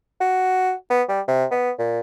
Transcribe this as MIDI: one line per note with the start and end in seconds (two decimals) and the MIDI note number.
0.21 0.73 66
0.90 1.03 59
1.09 1.21 55
1.28 1.45 48
1.51 1.71 59
1.79 2.00 46